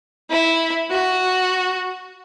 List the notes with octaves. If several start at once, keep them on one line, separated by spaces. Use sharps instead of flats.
E4
F#4